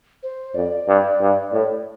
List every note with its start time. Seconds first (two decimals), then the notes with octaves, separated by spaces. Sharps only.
0.23 C5
0.55 F2 D5
0.88 G2
1.21 G2
1.53 A2